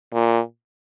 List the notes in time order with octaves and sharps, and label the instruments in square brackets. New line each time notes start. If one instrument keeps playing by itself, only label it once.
[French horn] A#2